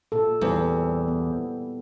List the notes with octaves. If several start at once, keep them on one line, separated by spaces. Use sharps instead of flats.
A#2 A4
E2 G3 C4
B3